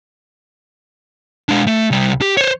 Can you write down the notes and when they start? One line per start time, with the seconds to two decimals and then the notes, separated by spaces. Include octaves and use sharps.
1.49 G#3 D4
1.67 A3
1.91 C2 G3
2.21 G4
2.37 C5 C#5